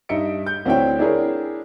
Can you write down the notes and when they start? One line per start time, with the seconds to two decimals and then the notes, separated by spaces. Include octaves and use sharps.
0.09 G2 D#4 E5 C#7 D7
0.46 G6
0.65 D2 C4 D4 E4 C#5 G5
0.99 D4 E4 G#4 A#4 C#5